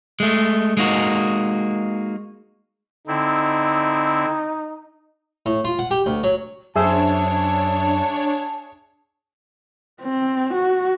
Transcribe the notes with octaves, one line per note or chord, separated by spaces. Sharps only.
G#3 A3
G#3 A#3 D#4 F#4
D3 C4 D#4 E4
A2
F4
F#5
G4
D2
F#3
F#2 D4 G#4 C5 C#5 E5 A5 E6
C4
F#4